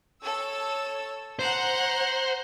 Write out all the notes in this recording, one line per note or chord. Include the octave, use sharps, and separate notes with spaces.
A4 C#5 E6
C5 F#5 A#5